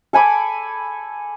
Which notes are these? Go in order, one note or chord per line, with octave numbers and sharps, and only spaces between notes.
A4 G#5 B5 D6